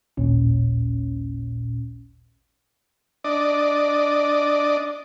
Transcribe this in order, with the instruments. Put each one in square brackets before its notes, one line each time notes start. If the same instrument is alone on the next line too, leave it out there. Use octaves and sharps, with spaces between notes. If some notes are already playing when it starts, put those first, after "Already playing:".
[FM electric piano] A1 D#2 A#2 C#4
[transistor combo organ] D4 D5 D#5